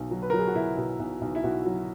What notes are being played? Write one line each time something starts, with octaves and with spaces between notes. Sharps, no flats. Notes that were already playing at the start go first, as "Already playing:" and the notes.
Already playing: B1 B2
F#3
B4
A#4
F#3
G#4
F#4
B2 E4
B2
B1
B1
E4
B1 F#4
F#3